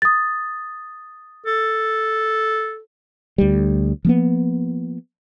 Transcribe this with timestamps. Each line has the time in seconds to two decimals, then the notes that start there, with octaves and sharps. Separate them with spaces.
0.02 D#6 A6
1.46 A4
3.38 D2 G3
4.05 F3 A#3 B3